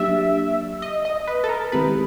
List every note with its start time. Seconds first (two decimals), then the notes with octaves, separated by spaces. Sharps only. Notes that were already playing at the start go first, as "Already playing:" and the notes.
Already playing: F#3 A#3 D4 G4 E5
0.82 D#5
1.05 D#5
1.28 B4
1.44 A4
1.49 A#4
1.72 D#3 G#3 C4 E4 G4 B4